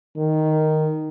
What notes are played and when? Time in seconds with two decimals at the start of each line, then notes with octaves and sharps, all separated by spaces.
0.17 D#3